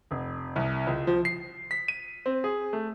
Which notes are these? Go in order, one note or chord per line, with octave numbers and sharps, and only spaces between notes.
F1
C2
C#2
F3
C7
B6
D#7
C4
G#4
A3